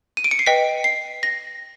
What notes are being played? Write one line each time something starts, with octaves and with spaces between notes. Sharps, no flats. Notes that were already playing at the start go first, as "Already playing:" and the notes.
D#7
D7
C#7
C7
B4 D#5 G5 B6
C7
A#6